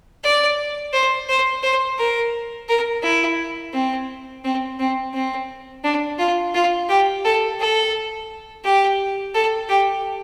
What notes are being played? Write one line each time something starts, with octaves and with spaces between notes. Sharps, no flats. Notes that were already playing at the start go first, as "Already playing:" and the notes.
D5
C5
C5
C5
A#4
A#4
E4
C4
C4
C4
C4
D4
F4
F4
G4
A4
A4
G4
A4
G4